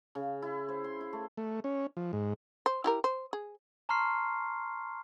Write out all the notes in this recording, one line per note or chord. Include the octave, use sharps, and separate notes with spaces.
C#3
E4
C5
C6
E4
A3
A3
C#4
F3
G#2
C5
E4 G4 A#4
C5
G#4
A5 A#5 C6 C#6 F6 C7